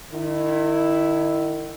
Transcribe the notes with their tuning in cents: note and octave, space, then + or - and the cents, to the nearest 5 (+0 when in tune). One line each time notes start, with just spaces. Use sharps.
D#3 -35 E4 +0